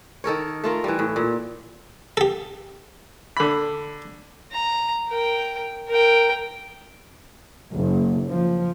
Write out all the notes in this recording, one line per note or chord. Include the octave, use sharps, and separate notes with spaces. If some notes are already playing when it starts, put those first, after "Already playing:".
D#3 A4 A#4 C#5
A3 F4 A#4
E3 G3
A2
A#2
G4 A4
D3 B5
A#5
A#4 G5
A#4 G5
F#1
F3